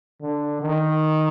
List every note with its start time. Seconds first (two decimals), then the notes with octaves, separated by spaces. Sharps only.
0.22 D3
0.62 D#3